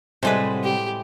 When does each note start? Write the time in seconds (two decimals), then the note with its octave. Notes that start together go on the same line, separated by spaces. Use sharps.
0.23 A2 C3 E3 G3 G#3 F#4 B4 C5
0.64 G4